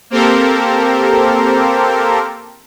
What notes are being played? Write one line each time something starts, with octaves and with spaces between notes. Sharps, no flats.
A#3 C4 G4 A4 A#4 C5